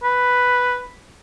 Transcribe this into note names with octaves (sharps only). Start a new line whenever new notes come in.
B4